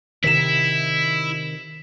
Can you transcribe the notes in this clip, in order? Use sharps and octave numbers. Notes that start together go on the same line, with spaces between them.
C3 D#3 E4 B6 E7